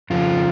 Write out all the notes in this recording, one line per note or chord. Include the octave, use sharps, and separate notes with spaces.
F2 C#3 F3 F4